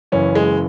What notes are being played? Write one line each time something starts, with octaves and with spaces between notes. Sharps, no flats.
F#1 F#2 E3 C#4
G#3